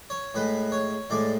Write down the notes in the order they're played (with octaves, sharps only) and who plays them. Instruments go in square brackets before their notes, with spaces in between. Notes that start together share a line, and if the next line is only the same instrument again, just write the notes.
[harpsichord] C#5
A2 G#3 B4
C#5
A2 G#3 D5